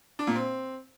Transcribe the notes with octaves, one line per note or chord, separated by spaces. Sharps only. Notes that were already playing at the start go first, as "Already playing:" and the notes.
D4
A#2
C4